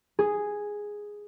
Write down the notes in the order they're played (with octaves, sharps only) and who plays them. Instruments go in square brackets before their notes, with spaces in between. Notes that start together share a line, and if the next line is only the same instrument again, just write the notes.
[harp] G#4